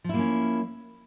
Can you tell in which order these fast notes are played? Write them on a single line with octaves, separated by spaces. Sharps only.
F3 E4 A#3 C#4